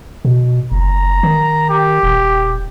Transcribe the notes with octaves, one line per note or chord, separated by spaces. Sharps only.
B2
F#1 A#5
D#3
G4
D#1